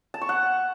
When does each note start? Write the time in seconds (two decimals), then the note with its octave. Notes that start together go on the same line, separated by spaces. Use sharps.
0.14 A5
0.21 C#6
0.29 F#5